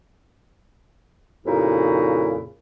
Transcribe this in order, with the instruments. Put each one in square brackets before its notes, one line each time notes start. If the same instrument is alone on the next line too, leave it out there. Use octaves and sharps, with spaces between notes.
[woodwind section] F2 A#2 C#3 D#4 E4 F#4